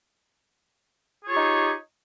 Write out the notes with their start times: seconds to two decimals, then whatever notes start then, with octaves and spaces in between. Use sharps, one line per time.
1.24 G#4
1.27 C#5
1.30 F4
1.32 G4
1.35 D#4